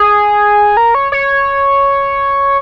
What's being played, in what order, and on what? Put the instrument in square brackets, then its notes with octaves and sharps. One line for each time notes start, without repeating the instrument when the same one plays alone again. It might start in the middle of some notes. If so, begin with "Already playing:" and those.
Already playing: [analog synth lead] G#4
A#4
C#5
C#5